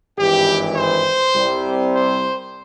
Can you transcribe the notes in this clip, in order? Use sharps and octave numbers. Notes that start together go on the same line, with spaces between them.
G#1 G2 E3 G4
C5
C2 C3 G3 C4
C5